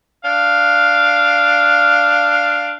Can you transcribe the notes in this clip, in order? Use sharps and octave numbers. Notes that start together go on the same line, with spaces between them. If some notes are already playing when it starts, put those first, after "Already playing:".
D4 F5